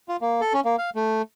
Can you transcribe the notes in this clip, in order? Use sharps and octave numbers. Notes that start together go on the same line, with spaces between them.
F4
A#3
A4
C#4
A#3
F5
A3